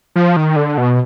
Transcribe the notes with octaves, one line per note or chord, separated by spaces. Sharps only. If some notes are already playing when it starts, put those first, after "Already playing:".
F3
D#3
D3
B2